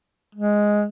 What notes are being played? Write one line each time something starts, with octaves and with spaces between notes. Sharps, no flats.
G#3